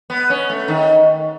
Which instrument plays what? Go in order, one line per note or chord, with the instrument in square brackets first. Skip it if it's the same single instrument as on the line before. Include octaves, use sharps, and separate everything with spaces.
[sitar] B3
C#4
A3
D#3